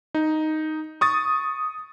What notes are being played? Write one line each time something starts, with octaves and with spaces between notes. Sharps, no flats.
D#4
C#6 D#6 A6